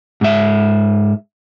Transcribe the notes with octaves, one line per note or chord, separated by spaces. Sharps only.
G#2 E5